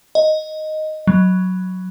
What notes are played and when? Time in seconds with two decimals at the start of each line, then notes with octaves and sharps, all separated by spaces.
0.15 D#5
1.07 F#3